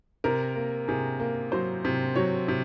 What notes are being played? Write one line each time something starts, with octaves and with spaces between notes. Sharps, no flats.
C3 A#4
A#3
C3 G#4
A#3
F#3 C5
C3
F#3 C#5
C3